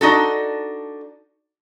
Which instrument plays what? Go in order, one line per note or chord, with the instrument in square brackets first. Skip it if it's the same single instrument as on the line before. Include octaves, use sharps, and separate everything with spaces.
[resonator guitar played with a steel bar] D4 D#4 F#4 A4